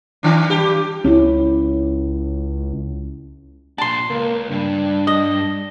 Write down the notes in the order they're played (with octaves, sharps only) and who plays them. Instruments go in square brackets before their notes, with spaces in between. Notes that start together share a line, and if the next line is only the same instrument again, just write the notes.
[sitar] D#3 D4
G2 G4
[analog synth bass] C#2 [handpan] C#4 E4
[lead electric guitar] A#2 D4 [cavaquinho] A5 C6
[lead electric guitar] C#2 [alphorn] A#3
[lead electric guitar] G2 [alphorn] D4
[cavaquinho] D#5